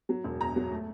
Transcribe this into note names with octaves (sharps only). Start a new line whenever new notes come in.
F#3
E1
E2 A#5
F#3
A3